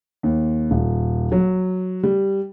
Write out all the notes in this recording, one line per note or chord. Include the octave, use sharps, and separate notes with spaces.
D#2
D#1
F#3
G3